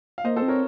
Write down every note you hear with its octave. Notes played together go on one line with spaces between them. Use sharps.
F5
A#3 C5 D#5
A4 C5
C4
A#4 C#5